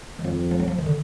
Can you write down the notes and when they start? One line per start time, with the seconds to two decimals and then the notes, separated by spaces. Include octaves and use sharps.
0.19 D#3
0.24 F2 F3
0.51 F3
0.60 F#3
0.68 F3
0.79 D#3
0.86 D3